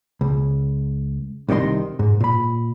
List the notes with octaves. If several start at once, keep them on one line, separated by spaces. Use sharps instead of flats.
C#2
C2 C3 D#3 D#5 C6
G#2
A#2 B5